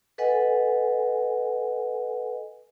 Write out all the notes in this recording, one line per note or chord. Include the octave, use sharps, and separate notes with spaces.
A4 B4 D#5 F#5 G#5